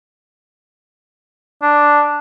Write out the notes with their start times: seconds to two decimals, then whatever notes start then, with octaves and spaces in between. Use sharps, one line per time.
1.63 D4